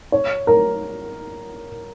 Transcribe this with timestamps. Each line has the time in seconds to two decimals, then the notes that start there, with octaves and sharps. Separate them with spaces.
0.12 C#5
0.47 A#4